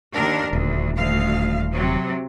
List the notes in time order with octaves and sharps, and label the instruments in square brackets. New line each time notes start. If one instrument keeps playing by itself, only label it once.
[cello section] D#2 D4 A#4
[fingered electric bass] D#1 [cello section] D2
[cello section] D2 F5
C3 F#3